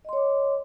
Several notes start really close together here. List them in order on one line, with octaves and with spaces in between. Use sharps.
D#5 C6 C#5 D6